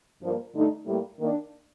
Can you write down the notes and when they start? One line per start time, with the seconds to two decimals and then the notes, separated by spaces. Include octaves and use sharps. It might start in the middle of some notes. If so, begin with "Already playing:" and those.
0.22 G2 F3 A#3
0.54 G2 D3 A3 D#4
0.86 A2 G3 A#3
1.19 D#3 A#3 D4